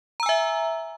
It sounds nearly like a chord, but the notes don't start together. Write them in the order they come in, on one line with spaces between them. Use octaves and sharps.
A#5 E6 G#5 E5